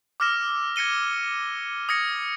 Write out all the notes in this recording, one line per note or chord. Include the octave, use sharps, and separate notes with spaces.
D6 E6 F6 A#6 E7
G#6 A#6 C#7 D#7 G7
D#6 G#6 A#6 C#7